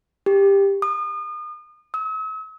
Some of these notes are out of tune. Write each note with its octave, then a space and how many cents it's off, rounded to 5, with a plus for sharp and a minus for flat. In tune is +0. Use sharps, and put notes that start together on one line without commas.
G4 +15
D#6 -35
E6 -45